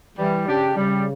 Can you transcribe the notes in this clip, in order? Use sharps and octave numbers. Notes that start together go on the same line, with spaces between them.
E3 G3
C#3 D4 G4
C#3 G3